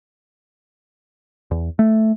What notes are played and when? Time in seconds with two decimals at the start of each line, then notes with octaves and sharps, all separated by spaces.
1.51 E2
1.79 A3